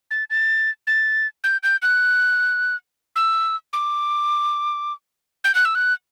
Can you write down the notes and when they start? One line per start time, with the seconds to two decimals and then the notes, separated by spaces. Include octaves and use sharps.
0.11 A6
0.30 A6
0.87 A6
1.44 G6
1.63 G6
1.82 F#6
3.16 E6
3.73 D6
5.44 G6
5.55 F#6
5.65 E6
5.75 F#6